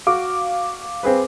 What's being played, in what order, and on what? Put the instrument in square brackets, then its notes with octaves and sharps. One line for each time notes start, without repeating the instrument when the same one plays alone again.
[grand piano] F#4 [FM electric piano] F5 D6
[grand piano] C4 G#4 B4